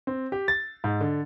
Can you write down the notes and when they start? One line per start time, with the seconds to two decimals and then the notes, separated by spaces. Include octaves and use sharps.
0.07 C4
0.32 G4
0.48 A6
0.84 G#2
1.01 D3